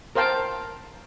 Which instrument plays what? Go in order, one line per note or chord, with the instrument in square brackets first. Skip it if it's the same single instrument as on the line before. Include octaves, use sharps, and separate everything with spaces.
[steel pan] A#4 C5 F5 G5 A5